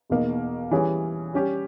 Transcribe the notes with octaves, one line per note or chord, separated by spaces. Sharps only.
E2 B2 A#3 D#4
E3 G3 C#4 G#4 C#5
G3 C#4 G4